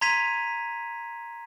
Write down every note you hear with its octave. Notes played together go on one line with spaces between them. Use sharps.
A#5 C6 G#6 B6 D#7 F7